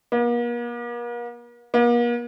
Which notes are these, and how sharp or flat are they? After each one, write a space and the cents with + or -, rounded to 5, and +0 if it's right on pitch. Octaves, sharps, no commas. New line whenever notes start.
A#3 +45
A#3 +45